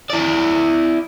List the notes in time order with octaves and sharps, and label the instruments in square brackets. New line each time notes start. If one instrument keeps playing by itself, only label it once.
[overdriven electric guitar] E4 D5